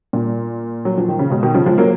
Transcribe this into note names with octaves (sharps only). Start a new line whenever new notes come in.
A#2
F#3
F3
D#3
C#3
G#2 B2
B2 D#3
C#3 F3
F3 G#3
F#3 A#3